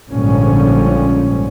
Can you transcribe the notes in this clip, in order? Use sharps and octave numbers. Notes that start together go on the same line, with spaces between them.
A#1 G#2 D3 F3 G3 C#4